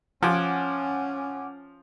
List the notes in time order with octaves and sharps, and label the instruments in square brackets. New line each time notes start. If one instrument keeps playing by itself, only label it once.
[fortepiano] F3 [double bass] C#4 [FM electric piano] F#5 G#5 D6